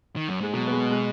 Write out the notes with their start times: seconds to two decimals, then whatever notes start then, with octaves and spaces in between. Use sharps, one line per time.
0.16 D#3
0.28 F#2
0.41 G#2 G#3
0.53 B2 F#3
0.68 B3
0.72 G#3
0.91 G#3